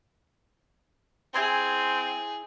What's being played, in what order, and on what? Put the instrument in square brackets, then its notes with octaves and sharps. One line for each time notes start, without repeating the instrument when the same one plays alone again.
[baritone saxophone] C4 [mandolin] E4 G#5 C6 [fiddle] G#4